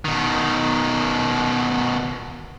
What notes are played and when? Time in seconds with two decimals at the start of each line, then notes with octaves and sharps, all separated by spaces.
0.05 B2 D#3